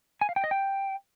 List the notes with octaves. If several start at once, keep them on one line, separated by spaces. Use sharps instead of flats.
G#5
F5
G5
D#5
G5